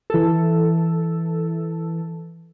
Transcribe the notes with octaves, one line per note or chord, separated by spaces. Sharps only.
E3 A4